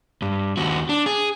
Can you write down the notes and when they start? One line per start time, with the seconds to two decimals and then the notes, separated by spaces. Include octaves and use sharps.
0.22 G2
0.57 D#2 F#4
0.89 D4
1.06 G#4